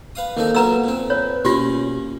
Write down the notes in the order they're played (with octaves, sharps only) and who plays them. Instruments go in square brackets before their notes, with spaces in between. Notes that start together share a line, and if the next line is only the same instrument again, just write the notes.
[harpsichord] B4 F5 D#6
[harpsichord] D#3 C4 D#4 [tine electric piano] A#3 A4
[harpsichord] F#3 B3 F4 [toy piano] B4 A#5 E6
[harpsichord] A#2 C4
[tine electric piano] B4 [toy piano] C#5
[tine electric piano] B2 [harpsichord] A#3 C#4 G#4 [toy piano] F4 G4